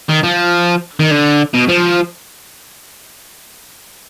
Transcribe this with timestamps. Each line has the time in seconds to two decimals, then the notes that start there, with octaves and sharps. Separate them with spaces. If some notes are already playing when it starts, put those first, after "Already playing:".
0.09 D#3
0.23 F3
1.00 D#3
1.11 D3
1.54 B2
1.69 F3